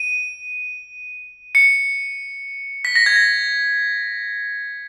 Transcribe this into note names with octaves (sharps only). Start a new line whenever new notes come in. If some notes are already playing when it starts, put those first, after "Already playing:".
Already playing: D#7
C#7
B6
A#6
G#6
A#6